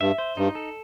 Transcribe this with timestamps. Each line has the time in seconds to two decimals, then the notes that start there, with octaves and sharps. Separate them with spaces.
0.01 G2 E5
0.18 C5
0.37 G2 D#4
0.55 A4